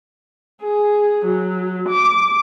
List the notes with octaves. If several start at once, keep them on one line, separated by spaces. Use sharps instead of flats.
G#4
F#3
D6